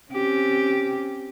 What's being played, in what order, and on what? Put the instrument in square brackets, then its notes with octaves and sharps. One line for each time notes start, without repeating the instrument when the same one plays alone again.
[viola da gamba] C4 C#4 G4